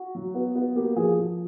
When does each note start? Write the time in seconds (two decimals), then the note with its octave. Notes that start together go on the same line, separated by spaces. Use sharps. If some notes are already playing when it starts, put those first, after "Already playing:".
Already playing: F#4
0.15 F#3
0.34 B3
0.55 B3
0.75 A#3 G4
0.96 F3 G#4
1.17 F3